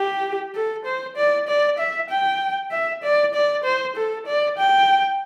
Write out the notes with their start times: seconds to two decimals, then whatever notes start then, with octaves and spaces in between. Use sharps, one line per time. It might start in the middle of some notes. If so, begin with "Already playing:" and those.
Already playing: G4
0.55 A4
0.85 C5
1.16 D5
1.48 D5
1.78 E5
2.09 G5
2.71 E5
3.03 D5
3.34 D5
3.64 C5
3.96 A4
4.26 D5
4.58 G5